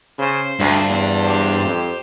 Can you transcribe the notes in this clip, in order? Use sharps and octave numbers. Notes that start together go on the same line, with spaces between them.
C#3 C5
D2 G2
E2
G4 C5
F2